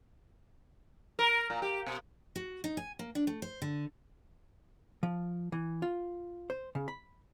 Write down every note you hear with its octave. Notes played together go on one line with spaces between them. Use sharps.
A#4
A#2
G4
B2
F#4
D#4
G#5
A#3
D4
A3
C5
D3
F3
E3
F4
C5
C#3
B5